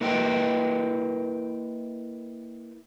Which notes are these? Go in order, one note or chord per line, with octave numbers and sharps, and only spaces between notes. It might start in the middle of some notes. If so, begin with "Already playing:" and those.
A#3 E4 B4 D#5 G5